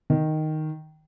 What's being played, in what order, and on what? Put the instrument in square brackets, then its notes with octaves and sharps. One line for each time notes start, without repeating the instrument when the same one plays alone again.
[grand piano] D#3